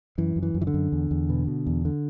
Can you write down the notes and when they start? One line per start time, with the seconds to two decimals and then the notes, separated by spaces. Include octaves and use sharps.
0.18 F#2 E3
0.36 F#2
0.43 E3
0.54 F#2
0.61 E3
0.67 D3
0.74 F#2
0.92 E2
1.11 E2
1.30 B2
1.47 B2
1.66 E2
1.85 D3